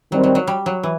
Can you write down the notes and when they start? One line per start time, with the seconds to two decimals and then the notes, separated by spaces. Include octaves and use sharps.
0.12 D#3 F#3 G3 C4
0.23 F#3
0.35 F#3
0.47 G3
0.66 F#3
0.83 E3